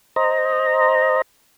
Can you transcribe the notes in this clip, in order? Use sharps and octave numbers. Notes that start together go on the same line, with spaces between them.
C5 D#5 A#5